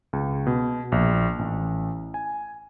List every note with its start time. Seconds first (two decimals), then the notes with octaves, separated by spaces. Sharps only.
0.13 C#2
0.47 B2
0.92 A#1
1.39 A1
2.14 G#5